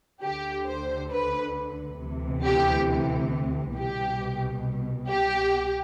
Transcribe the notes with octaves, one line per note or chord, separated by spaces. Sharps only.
D2 D3 G4
C5
B4
D2 C3 E3
G4
C2 B2 G4
G4